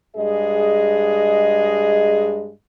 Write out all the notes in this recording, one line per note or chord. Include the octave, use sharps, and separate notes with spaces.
G2 G#3 G#4 D#5